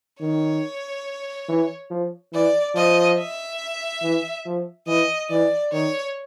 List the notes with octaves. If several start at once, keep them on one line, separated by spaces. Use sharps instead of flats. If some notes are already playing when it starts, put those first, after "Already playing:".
D#3 C#5
E3
F3
E3 D5
F3 D#5
E5
E3
F3
E3 D#5
E3 D5
D#3 C#5